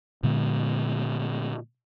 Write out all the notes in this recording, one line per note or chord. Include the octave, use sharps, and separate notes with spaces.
A#2 D3 G#3 B3